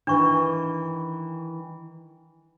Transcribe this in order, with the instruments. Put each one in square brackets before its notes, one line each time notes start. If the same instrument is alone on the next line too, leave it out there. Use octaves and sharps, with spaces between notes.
[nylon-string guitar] D#3 E3 [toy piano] D4 C#6